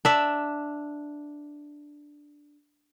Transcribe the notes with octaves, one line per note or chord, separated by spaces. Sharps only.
D4 E5